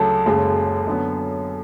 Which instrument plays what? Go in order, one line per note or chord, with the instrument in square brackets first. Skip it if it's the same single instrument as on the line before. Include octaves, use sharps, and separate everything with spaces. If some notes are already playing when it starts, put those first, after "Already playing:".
Already playing: [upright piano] D2 C#3 F#3 [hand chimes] A4 A5
[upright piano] F#1 F#2 C#3 G#3
F#2 D3 F#3 B3